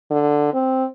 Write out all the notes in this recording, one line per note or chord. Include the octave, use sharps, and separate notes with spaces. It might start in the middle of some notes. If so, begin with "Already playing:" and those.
D3
C4